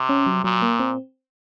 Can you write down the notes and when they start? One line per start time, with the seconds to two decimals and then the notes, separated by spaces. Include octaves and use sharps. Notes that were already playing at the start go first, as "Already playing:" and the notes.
Already playing: C3
0.09 C#4
0.26 F#3
0.44 A#2 F#3
0.62 A#3
0.80 C4